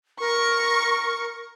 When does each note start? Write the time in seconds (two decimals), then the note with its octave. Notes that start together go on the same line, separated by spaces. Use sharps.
0.20 A#4 C#6